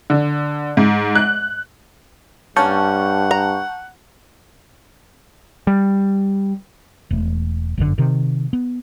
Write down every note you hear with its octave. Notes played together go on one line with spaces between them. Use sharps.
D3
G#2
F#6
G2 A#3 C#4 F#5 A5 C#6 G6
A#5
G3
E1 A3
G1 F#2 B2 D3
C3 D#3
B3